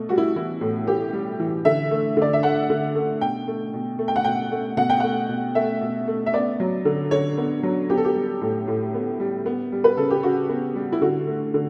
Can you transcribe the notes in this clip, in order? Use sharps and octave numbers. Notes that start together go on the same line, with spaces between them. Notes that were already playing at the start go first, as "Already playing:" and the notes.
Already playing: B2 A3
G3 F#4
E4
E3 E4
A2
B3 G4
G3
E3
D3 E5
A3
D3 D5
E5
A3 F#5
D3
A3
B2 G5
A3
B2
A3
G5
F#5
B2 G5
A3
B2 F#5
G5
A3 F#5
B2
A3 E5
B2
A3
E5
B3 D5
F#3
D3
D3 C#5
B3
F#3
B3 G4
A4
G4
G3
A2
A2
B3
G3
B3
G3
B4
C#3 A4
G4
C#3 F#4
B3
G3
E4
D3 F#4
A3
D3